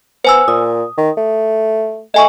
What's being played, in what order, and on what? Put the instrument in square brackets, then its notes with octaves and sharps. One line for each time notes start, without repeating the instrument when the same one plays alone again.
[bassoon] B3 [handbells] C5 G#5 E6
[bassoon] A#2 [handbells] D#6
[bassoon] D#3
A3
[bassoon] A3 [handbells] D#5 G#5 C#6